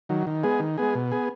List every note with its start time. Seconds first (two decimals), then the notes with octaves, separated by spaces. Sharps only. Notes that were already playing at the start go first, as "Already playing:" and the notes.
0.09 D#3 F#3
0.27 D#3
0.43 G#3 B3 G#4
0.60 D#3
0.78 G#3 B3 G#4
0.95 B2
1.12 B3 G#4